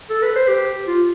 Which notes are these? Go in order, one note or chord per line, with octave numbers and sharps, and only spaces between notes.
A4
B4
C5
G4
F4